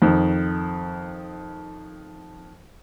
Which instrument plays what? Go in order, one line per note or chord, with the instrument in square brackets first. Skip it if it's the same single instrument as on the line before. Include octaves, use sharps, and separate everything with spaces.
[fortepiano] F2 D#3